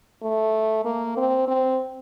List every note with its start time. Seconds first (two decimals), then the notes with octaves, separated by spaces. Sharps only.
0.22 A3
0.85 A#3
1.17 C4
1.48 C4